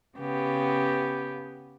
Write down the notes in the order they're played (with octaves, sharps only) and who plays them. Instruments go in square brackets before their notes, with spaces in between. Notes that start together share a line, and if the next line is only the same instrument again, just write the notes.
[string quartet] C#3 B3 G4